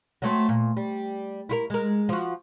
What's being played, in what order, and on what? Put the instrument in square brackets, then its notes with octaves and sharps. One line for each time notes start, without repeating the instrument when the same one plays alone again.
[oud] F#3 A3 C4
A#2
G3
E4 F4 A#4
G#3 A#4
F3 F#4